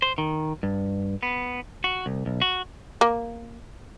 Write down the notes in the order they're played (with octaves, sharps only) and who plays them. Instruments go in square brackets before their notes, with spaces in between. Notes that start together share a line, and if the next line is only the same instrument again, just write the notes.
[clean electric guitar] C5
D#3
G2
B3
F#4
C2
B1
F#4
[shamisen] A#3